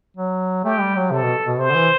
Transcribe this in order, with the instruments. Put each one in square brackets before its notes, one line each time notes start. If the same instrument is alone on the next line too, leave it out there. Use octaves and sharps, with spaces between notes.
[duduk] F#3
[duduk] A3 [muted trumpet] G4
[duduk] G3
F#3
[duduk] C3 [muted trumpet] A4
[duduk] B2
B2
[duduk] C3 [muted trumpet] C5
[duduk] D3
E3